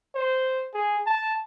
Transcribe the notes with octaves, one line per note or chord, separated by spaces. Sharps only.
C5
G#4
A5